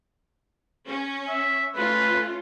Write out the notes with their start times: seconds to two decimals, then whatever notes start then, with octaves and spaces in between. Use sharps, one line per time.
0.88 C#4
1.29 E5
1.76 A3 C#4 F4 B4